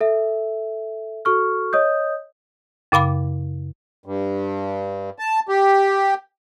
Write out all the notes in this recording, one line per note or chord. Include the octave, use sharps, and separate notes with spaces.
A4 E5
F#4 A4 C#6 F6
C#5 D#5 D#6 G6
F#2 C#3 F5 B5 D6
G2
A5
G4